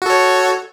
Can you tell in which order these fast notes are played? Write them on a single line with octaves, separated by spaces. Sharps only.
F#4 A4 C#5